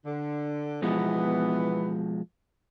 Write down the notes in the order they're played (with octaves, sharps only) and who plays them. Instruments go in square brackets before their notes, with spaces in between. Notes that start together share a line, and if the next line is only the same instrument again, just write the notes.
[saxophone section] D3
[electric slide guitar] B2 F3 G#3 [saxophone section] E3 B3